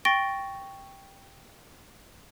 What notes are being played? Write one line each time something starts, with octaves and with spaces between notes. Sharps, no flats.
G5 C#6 A6 A#6 D7 G7